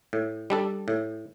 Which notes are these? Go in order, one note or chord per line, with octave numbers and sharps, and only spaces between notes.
A2
G3 D4 A4
A2